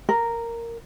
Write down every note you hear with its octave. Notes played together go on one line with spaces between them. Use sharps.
A#4